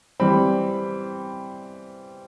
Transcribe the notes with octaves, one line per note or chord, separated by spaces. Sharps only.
E3 G3 C4 B5